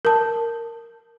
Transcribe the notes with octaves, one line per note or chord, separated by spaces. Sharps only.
A#4 A5